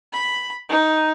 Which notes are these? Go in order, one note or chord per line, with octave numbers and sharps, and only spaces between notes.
B5
D#4